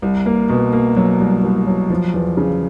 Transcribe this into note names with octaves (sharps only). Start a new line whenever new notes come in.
C2
A#3
B2
A#3
F#3
C2
C2
F#3
F3
E2
C#3